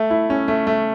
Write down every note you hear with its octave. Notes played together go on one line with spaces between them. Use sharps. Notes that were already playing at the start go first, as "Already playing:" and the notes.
Already playing: A3
E4
C#4
A3
A3